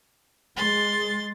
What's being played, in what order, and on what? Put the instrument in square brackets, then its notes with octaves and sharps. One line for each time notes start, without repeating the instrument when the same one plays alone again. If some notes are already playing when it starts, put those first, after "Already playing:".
[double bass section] G#3 [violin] C6 A6